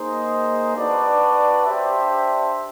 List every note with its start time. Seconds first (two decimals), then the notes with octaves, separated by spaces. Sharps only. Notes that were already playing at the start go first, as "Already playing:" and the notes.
Already playing: A#3 D#4 G#4 C5 D#5
0.76 D4 F#4 B4 D5
1.65 D4 G4 C5 E5